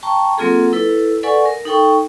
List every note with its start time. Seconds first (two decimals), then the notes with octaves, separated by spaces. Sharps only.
0.03 G5 A5 A#5 C#6
0.38 F#3 A#3 C4 F4 G#4 A4
0.73 E4 A4 B4
1.23 A4 B4 D5 F#5 G#5 C#6
1.46 A#4
1.65 D#4 A4 G5 C#6